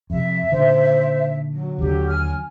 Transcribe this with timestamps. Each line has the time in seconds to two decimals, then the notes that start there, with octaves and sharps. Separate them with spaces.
0.10 F2 C3 E5
0.52 A#2 D3 D#3 C5
1.53 F#3
1.78 D#2 D3 G4
2.09 G#5 F6